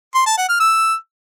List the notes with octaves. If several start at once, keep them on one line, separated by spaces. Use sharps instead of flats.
C6
A5
F#5
F6
E6